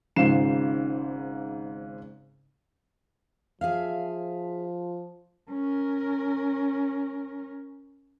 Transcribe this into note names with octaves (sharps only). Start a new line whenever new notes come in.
G#1 G#2 C#3 F4 C7 E7
F3 G#4 E5 F5
C#4 A#4